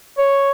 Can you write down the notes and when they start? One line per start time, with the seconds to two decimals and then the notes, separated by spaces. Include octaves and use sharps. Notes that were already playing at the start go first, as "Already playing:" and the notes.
0.18 C#5